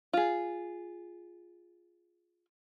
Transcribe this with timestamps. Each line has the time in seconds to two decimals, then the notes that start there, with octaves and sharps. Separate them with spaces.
0.13 F4 G#4